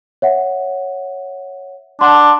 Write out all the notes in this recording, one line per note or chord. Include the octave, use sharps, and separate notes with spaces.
C#5 E5 F#5
D4 F#5 A5 C6